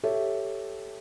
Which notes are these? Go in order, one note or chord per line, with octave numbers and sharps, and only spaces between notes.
G4 A4 C#5 E5